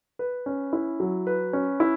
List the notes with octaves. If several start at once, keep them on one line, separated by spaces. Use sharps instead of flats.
B4
C#4
E4
F#3
B4
C#4
E4